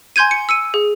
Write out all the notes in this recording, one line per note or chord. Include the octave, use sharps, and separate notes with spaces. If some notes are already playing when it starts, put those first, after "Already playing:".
G#5 C6 G6 G#6 D#7
C#7
E6 C#7 D#7
G#4